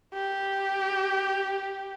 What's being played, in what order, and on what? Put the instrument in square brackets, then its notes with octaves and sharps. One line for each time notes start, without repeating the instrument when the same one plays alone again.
[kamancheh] G4